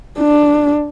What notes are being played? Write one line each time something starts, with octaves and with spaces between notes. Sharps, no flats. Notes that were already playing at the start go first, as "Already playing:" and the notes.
D4